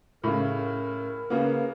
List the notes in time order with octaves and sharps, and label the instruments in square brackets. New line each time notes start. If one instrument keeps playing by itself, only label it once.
[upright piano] A2 C#3 [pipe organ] A#4
[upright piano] C#3 A#3 B3